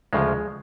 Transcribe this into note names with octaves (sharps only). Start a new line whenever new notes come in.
D2 C#3 F3 G#3